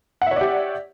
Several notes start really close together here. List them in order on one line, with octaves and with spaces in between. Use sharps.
F#5 E5 C#5 D5 G4